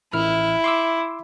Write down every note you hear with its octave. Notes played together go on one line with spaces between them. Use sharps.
A1 E4 F6
C6 D6 E6